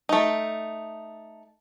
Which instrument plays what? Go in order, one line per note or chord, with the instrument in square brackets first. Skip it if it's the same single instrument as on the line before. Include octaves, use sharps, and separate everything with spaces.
[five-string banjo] A3 D#4